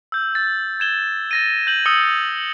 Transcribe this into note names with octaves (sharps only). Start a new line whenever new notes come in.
E6 G6
A6
G#6 E7 G7
A6 A#6 D#7
G6 F#7
D#6 E6 C#7 G7